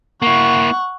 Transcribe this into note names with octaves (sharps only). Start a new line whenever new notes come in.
A#3 E4 F#5 C#6